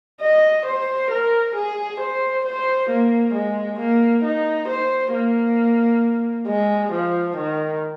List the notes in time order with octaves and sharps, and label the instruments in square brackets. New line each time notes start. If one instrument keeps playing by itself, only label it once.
[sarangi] D#5
C5
A#4
G#4
C5
C5
A#3
G#3
A#3
D#4
C5
A#3
G#3
F3
D#3